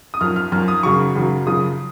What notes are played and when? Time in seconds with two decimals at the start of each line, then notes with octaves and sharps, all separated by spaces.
0.14 D#6
0.21 F#2 F3 F6
0.36 F6
0.52 F#2 F3 F6
0.68 D#6
0.83 F#2 C#3 F#3 C#6
1.15 F#2 C#3 F#3
1.47 F#2 C#3 F3 D#6